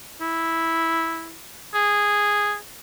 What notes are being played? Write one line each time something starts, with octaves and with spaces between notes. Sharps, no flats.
E4
G#4